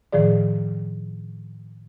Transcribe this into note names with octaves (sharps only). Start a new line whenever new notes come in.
A2 D#3 F3 G#4 D5